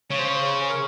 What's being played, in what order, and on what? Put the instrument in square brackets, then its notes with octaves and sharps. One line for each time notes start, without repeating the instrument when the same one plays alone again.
[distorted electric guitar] C#3 [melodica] C#5
[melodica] C5
C#5
C5
C#5
G#4
A#4